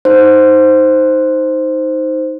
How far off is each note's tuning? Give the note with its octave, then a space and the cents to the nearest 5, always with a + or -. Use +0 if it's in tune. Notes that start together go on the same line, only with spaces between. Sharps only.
D#4 +10 C5 +0